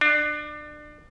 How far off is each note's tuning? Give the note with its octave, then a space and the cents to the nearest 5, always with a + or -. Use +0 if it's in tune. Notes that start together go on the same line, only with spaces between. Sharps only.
D4 +30